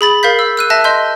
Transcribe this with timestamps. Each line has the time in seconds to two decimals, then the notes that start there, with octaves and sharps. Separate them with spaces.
0.01 G#4 B5 A6
0.23 A#4 F5 G6 B6
0.39 E6
0.57 E6 F#6 D#7
0.70 E5 A5 F#6 A#6
0.84 D#5 C6 G6